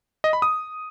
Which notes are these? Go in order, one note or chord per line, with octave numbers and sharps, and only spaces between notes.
D#5
B5
D#6